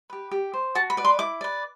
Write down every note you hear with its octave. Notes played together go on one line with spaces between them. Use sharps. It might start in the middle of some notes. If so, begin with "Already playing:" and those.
G4 B4
G4
C5
F#4 A5
B5
B4 D5
C6
E4 D6
B4 D5